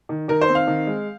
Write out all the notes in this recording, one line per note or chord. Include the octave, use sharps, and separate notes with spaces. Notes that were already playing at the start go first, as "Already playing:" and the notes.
D#3
D#3 A#4
C5
C4
F5
D#3
G#3